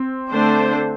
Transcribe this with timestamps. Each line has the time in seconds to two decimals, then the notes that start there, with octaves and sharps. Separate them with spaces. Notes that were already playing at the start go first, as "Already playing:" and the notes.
Already playing: C4
0.30 D3 A3 D4 C5